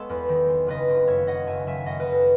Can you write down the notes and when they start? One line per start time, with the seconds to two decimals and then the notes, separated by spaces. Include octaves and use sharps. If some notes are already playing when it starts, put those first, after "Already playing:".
Already playing: G#3 B3 A4 C#5
0.09 E2 B4
0.29 D#3
0.48 G#3
0.67 F#1 B4 D#5
0.89 F#1
1.08 F#2 C#5 E5
1.27 D#3 D#5 F#5
1.47 F#1 E5 G#5
1.67 F#1 E5 G#5
1.86 F#2 D#5 F#5
2.00 B4 D#5
2.06 D#3
2.12 A4